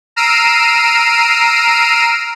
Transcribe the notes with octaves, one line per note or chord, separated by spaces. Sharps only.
A#5 E6 F6 C7 D7 D#7